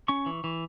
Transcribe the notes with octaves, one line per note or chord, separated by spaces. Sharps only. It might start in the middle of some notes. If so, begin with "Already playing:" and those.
C#4 C#6
E3
E3